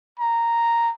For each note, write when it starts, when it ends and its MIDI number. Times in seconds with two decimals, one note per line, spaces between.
0.19 0.91 82